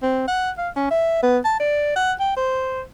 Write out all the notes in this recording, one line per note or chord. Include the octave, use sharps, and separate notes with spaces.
C4
F#5
F5
C#4
E5
B3
A5
D5
F#5
G5
C5